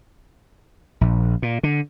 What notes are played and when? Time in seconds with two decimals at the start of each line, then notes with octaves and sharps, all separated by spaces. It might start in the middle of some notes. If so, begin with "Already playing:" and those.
1.01 A#1
1.42 A#2
1.63 D3